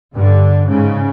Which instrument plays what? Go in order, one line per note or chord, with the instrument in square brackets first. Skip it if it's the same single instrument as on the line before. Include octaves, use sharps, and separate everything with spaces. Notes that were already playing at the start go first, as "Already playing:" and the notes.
[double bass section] G2 D3
G#2 C#3